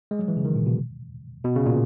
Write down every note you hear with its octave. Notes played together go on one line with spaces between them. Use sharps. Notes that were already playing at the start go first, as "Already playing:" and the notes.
G#3
F#3
E3
C#3
D#3
A#2
B2
B2
C#3
A#2